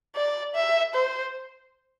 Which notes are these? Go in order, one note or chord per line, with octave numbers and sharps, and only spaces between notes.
D5
E5
C5